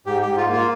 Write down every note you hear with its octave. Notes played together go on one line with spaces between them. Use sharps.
G#2 G4
G#2 G4
F4
A#3
F4